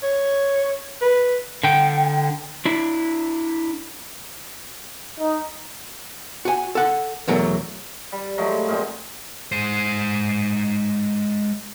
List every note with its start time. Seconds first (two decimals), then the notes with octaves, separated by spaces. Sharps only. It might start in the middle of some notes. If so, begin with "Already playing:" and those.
0.03 C#5
1.02 B4
1.63 D3 G5
2.65 D4 E4
5.19 D#4
6.45 F#4 G#5
6.75 A4 F#5
7.28 E2 B2 F#3 A3 A#4
8.12 G3
8.38 F3 F#3 G#3 A3
8.68 A#2 G#3 C4
9.52 G#3 C5